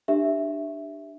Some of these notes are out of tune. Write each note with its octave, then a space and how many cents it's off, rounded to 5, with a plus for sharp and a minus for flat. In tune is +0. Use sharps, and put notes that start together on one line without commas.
D4 +20 G4 +0 E5 +0